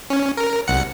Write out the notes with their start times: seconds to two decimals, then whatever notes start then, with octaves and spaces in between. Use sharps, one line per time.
0.10 C#4
0.37 A#4
0.68 C2 F#5 C#7